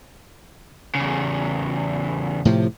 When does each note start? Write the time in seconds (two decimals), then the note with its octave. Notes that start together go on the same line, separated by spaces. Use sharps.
0.95 E2 C#3
2.45 A2 C3 F3